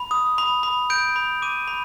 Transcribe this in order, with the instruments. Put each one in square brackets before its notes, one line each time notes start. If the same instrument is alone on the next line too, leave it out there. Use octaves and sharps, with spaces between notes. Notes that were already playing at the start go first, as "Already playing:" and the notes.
Already playing: [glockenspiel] B5
D#6
B5
B5
G6 D7
B5
D6 D#7
B5